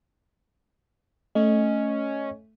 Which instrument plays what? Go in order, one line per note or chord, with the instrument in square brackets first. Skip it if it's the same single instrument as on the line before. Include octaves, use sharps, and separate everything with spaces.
[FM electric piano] A3 [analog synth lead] C#4 [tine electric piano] D#5